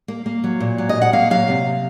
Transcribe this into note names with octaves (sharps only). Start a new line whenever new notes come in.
A#3
A#3
F#3
A#2
F#3
D#5
A#2
F#5
A#3 F5
F#3 F5
C3